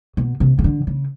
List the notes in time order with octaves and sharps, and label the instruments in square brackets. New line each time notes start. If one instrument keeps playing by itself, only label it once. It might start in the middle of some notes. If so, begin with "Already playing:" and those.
[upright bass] B2
C3
C#3
D3
C#3